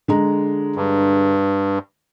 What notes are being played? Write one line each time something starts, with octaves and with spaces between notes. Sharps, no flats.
D3 G#3 A#5
G2